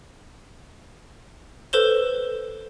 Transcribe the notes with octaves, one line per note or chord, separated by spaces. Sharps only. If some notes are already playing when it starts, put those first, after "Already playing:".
A4 B4 C5 E7 G7